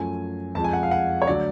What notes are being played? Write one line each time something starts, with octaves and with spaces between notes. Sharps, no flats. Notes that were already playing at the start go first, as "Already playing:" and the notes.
Already playing: F#2 F3 A3 G#5
F2 F3 G#3 A5
G#5
F#5
F5
F#5
C#5
D3 F#3 A3 D5